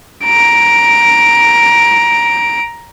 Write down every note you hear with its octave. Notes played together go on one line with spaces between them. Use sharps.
A#5 D7